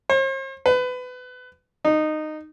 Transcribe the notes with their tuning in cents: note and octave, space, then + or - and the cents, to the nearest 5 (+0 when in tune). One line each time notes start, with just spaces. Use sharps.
C5 +45
B4 +25
D#4 -15